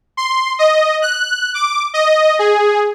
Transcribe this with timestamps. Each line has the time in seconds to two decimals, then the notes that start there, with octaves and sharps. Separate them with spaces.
0.17 C6
0.59 D#5
1.02 F#6
1.54 D6
1.94 D#5
2.39 G#4